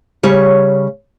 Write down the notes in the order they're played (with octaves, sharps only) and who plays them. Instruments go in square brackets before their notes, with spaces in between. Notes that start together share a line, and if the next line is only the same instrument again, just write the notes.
[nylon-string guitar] C#3 G3 C#5